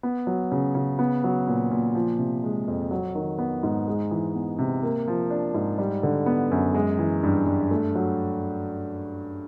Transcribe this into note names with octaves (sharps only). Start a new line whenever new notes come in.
B3
F#3
C#3
C#3
B3
F#3
A#2
A#2
F3
C3
G#3
F2
F#3
D#3
B3
G#2
G#3
E3
B3
C3
A#3
F3
D4
G#2
G3
D3
B3
F#2
G#3
E3
G2
G2
A3
F#3